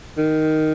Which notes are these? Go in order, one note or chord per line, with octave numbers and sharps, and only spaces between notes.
D#3